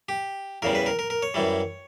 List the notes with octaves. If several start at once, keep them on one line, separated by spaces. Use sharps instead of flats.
G4
E2 C#3 G3 A#4
B4
A#4
A#4
A#4
C#5
F#2 E3 G3